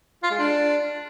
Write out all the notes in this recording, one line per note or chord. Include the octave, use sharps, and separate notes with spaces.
F4
G#3
D4